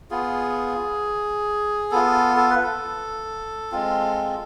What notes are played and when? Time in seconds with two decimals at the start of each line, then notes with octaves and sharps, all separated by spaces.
0.11 B3 F4 G#4
1.91 B3 F4 A4
2.37 A4
2.50 B4
2.63 A4
3.72 G#3 C4 F4